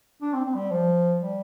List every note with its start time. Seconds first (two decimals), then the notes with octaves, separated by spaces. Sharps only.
0.22 D4
0.34 C4
0.45 C4
0.54 G3
0.71 F3
1.20 G3